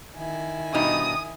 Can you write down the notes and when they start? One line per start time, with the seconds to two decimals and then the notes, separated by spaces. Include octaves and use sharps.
0.17 D#3 E4 G#5
0.74 G2 B2 D#4 D#6